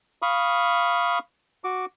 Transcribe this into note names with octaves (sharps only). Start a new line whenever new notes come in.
F5 B5 C#6 D#6
F#4 D6